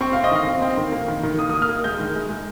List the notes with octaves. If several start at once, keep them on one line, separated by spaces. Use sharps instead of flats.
C4 C#6
C4 F5
D#5
D#3 F5
C4
C4
D#3
A#3
D#3
D#3
A#3 D#6
A#3 D#6
F6
A#3
G#3 G6
D#3
G#3
G#3